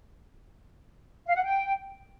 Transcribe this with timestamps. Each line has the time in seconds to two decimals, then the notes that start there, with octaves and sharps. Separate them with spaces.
1.26 F5
1.35 F#5
1.44 G5